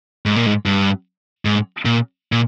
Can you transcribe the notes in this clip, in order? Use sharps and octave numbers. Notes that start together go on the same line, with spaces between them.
G#2
A#2
G#2
G2
G#2
A#2
A#2